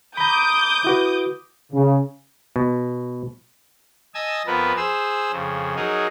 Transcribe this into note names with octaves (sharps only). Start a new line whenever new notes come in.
A#5 B5 D6 D#6 G6
E4 F#4 B4
C#3
B2
D#5 G#5 A5 D#6 E6
F2 F3 B3 A#4 B4
G#4 C5 E6
F2 C#3
F#3 D#4 G#4 A#4